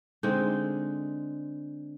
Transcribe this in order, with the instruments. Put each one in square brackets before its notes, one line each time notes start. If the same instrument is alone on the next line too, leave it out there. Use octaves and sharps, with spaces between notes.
[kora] D3 G#3 C4 D#4